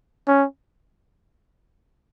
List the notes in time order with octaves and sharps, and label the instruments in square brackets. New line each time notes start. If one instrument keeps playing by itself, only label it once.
[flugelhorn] C#4